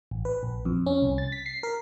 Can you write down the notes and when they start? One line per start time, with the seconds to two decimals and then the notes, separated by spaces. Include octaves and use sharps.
0.11 A1
0.25 B4
0.43 A#1
0.65 F2
0.86 C#4
1.02 C2
1.18 A6
1.32 B6
1.46 C7
1.63 A#4